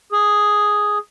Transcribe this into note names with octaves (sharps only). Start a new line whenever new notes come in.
G#4